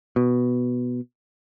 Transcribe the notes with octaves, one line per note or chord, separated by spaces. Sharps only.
B2